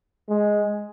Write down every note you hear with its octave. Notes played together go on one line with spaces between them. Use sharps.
G#3